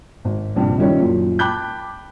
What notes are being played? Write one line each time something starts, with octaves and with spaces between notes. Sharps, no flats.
G#1
A#1 G2 C3 G3
D#3 F3 G3 C#4 E4 C#5
F#2 A#2
G5 A5 B5 D6 F#6 G6